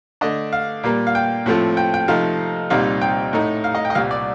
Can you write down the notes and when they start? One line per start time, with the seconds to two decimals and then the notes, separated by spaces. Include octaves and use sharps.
0.21 D3 A3 D4 D#5
0.53 F5
0.83 A#2 G3 A#3
1.07 F5
1.15 G5
1.46 A2 F3 A3 C4 F4
1.77 G5
1.94 G5
2.08 C3 F3 A3 D#4 F5
2.70 C2 A#2 G3 C4 D#4 F5
3.01 G5
3.33 A2 A3 D#4
3.64 F5
3.75 D#5
3.85 G5
3.90 D#5
3.95 C2 A#2 G3 F5
4.11 D5